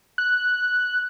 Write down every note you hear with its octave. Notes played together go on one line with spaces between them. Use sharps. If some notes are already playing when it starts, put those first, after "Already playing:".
F#6